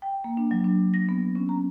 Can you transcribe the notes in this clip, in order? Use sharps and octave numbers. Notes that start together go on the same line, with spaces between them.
G5
A#3
D4
F#3
D4
A#6
B3
C#4
A#5